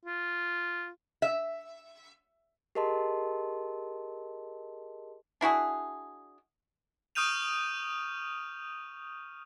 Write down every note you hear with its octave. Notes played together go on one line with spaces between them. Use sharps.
F4
E5
G4 G#4 A#4 D#5 A5 C6
D4 E4 F#4 G#4
C#6 D#6 F6 G6 D#7 F7